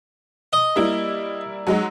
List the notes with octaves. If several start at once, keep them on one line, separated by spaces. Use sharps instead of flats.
D#5
G3 A#3 E4
F#3 G#3 D#4